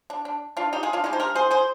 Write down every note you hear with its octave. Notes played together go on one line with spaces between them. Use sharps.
D4
D4
D4 F4
D#4 G4
F4 G#4
D4 F4
D3 G#3 D4 D#4 G4
C5
G4 A#4
G#4 C5
G#4 C5